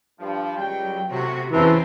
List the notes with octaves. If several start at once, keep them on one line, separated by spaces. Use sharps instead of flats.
G2 F3
C#2 F#3 G3 G5
A2 C3 F#3 F#4
E2 C#3 E3 C4 E5 A5 A#5